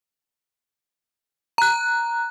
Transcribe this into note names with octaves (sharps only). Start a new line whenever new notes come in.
A#5 F#6